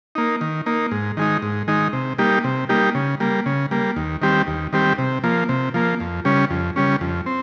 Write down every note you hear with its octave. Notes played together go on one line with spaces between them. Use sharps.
A#3 D#4
D#3
A#3 D#4
G#2
D#3 G#3 D#4
G#2
D#3 G#3 D#4
C3
G3 A#3 D#4 G4
C3
G3 A#3 D#4 G4
C#3
G3 A#3
C#3
G3 A#3
D#2
D#3 G3 C4 G4
D#2
D#3 G3 C4 G4
C3
F3 A#3
C3
F3 A#3
F2
C#3 G3 C#4
F2
C#3 G3 C#4
F2
C4